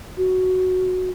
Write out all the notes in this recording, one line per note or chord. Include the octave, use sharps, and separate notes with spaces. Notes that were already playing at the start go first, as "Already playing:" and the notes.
F#4